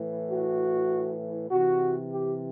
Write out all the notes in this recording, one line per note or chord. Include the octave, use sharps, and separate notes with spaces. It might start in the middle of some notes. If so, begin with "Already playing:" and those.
Already playing: A2 E3
F#4
C3 E3 F#4
G4